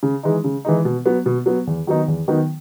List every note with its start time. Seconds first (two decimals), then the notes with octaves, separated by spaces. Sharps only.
0.03 C#3
0.23 E3 G#3 D#4
0.44 C#3
0.65 E3 G#3 D#4
0.85 B2
1.06 F#3 B3
1.26 B2
1.46 F#3 B3
1.67 E2
1.87 D#3 F#3 B3 D#4
2.08 E2
2.28 D#3 F#3 B3 D#4